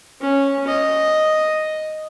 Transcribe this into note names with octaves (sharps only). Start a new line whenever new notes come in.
C#4
D#5